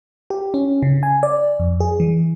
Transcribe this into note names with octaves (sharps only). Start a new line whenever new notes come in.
G4
C#4
C#3
G#5
D5
F2
G#4
E3